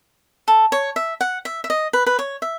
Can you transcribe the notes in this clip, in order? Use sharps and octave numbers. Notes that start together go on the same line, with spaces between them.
A4
C#5
E5
F#5
E5
E5
D#5
B4
B4
C#5
E5